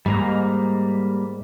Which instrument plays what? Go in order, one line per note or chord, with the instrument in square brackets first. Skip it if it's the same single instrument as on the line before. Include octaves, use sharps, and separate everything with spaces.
[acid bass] G#2 [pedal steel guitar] G3 A#3 A#5